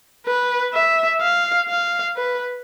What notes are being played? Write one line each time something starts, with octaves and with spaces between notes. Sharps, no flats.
B4
E5
F5
F5
B4